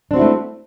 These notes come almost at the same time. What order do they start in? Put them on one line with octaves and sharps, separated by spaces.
D4 C4 F#4 E4 A3